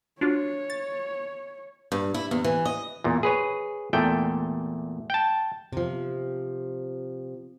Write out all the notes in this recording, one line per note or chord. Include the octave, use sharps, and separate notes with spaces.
D4 F4 F#4 C#5
A6
G2
E4
E2
E3
D#5
E2 A#2
G#4 B4 C#5
E2 A#2 A3 G5
G5 A5
C3 F3